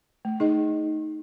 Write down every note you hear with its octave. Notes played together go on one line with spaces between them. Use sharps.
A3
D#4 G#4 D#5